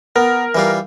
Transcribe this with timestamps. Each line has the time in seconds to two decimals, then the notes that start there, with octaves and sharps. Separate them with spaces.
0.16 B3 A#4
0.55 E3 G3 F4